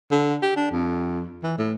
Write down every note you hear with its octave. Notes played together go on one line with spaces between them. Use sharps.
D3
G4
D4
F2
E3
A2